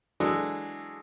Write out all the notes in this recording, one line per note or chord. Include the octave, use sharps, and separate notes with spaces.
E3 F#3 G#3 D4 G#4 A4